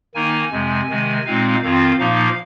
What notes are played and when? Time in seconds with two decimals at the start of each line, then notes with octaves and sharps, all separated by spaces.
0.15 D#3 A#3 D#4 G#5
0.51 F2 C3 G#3
0.89 C3 D#3 G#3
1.26 A#2 G#3 C4 D#4 F5
1.62 F2 D#3 C4 F4 F5
1.99 A#2 F3 A#3 D#4 F5